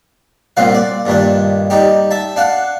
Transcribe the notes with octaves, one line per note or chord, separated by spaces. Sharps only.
C2 A#2 C4 F#4 F5
D5
G2 A#2 D#3 D4
G3 D#4 G4
E5 A5
D4 F5 F#5